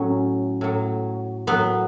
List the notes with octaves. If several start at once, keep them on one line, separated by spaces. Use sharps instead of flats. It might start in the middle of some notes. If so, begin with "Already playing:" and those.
Already playing: A2 F#3 C#4
A2 F#3
A2 F#3 B3